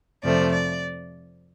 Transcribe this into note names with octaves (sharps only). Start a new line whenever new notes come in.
F2 C3 F3 A3 D5
D5